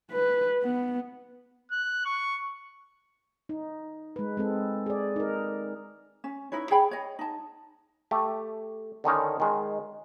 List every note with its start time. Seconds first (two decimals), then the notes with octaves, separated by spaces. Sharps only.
0.11 B4
0.63 B3
1.71 F#6
2.05 C#6
3.49 D#4
4.16 G#3 B4
4.37 G#3 C4 A4
4.86 G#4 D5
5.16 D#4 A#4
6.24 C#4
6.52 D#4 E4 B4 C#5
6.70 G#4 C#5 G5 B5
6.91 C#5 D#5
7.19 D#4 A5
8.11 A3 G4
9.04 D3 D#3 C#4 D#4
9.40 D#3 G#3